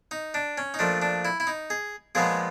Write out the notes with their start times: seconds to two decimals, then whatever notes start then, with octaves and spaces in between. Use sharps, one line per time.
0.11 D#4
0.34 D4
0.58 C#4
0.74 D#4
0.79 A#2 F3 A3 D4
1.02 D4
1.25 E4
1.40 E4
1.47 D#4
1.70 G#4
2.15 A#2 F3 G#3 B3 G#4